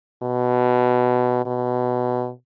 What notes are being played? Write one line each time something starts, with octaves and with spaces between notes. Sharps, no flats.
B2
B2